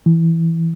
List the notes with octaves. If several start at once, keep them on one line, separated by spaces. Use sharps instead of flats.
E3